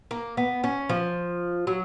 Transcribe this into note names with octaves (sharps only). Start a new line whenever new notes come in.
A#3
B3
C#4
F3
F#3